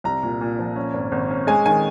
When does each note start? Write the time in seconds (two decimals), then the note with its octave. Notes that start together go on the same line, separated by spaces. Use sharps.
0.04 C2 A#5
0.23 A#2
0.41 A#2
0.59 F3
0.76 C#4
0.94 G#1
1.12 G#1
1.30 C#4
1.47 G#3 G#5
1.66 D#3 G#5